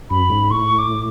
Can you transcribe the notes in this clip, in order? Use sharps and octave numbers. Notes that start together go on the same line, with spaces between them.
F#2 B5
G#2
A2 C#6
D6